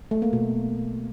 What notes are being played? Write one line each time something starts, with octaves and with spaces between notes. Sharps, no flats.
A3
A#3
B2